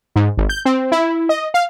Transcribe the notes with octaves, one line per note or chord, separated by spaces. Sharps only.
G#2
G#1
G6
C4
E4
D#5
F5